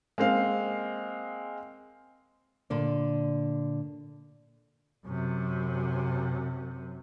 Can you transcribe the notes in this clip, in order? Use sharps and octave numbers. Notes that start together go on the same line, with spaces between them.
G#3 A#3 C4 F5
A#2 D3 D5
F#2 C3